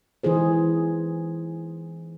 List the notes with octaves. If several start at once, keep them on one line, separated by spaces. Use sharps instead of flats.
E3 D#4 G#4 C5